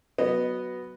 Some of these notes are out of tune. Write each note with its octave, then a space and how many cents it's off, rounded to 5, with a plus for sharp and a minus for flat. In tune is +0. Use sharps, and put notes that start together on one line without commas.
F#3 +0 B3 +0 D#5 -10